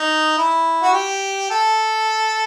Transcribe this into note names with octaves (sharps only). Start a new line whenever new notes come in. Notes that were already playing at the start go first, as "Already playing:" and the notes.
Already playing: D#4
E4
F#4
G4
A4